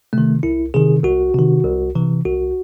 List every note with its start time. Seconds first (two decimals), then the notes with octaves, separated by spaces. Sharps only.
0.13 C3 D#3 A3
0.43 C2 E4
0.74 C3 D#3 G#4
1.04 C2 F#4
1.34 C3 D#3
1.64 C2
1.95 C3 E3
2.25 C2 F#4